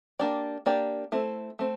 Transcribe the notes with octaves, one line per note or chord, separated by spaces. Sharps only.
A#3 D4 G4 D5
A#3 D4 G4 D5
A3 C4 E4
A3 C4